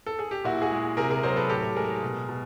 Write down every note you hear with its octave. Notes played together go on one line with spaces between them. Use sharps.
A4
G#4
G4
A#2 E4 F#4
F#4 G#4
G#3
C3 G#4 A#4
G#4 A#4
F#3 A#4 C5
A4 B4
A2 G4 A4
G#3 G#4 A#4
B2
B2